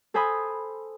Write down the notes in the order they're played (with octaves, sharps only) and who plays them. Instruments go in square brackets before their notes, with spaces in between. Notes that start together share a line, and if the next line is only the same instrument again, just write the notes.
[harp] A4 C5 G#5 B5 D#6